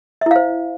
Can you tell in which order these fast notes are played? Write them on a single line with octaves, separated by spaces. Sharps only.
E5 E4 F5 C5